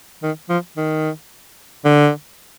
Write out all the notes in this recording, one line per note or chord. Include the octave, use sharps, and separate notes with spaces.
D#3
F3
D#3
D3